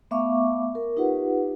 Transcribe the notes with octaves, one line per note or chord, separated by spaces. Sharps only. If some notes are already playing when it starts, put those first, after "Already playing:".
A3 B3 E5 F5 C#6 D6
A#4
D#4 F4 G4 B4 F#5